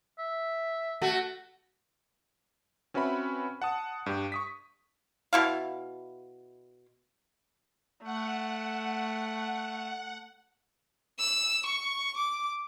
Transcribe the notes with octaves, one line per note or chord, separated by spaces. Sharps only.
E5
A3 F#4
C4 C#4 F#4 B4 E5 B5
F#5 A5 D#6
G2 G4
C#6 D#6 B6
B2 E4 F5
A3 F#5
E6
C#6
D6